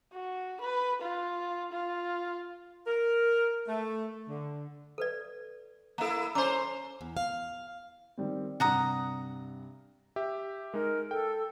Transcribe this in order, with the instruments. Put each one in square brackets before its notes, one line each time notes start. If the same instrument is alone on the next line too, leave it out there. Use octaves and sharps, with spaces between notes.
[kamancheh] F#4
B4
F4
F4
[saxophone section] A#4
A3
D3
[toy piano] A4 B4 D5
[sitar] A#3 E4 [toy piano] A4 E5 A#5
[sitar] C#4 C5 [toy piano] A#5 D6
[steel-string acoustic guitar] E2
F5
[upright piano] D#3 G3 C4
[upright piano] G2 C3 [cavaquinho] F#5 A#5 D#6
[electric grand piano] G4 E5
[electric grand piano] G#3 D#4 [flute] A#4
[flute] A4 [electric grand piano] G5